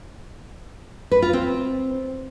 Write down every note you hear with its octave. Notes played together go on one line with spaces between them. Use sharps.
B4
F4
C4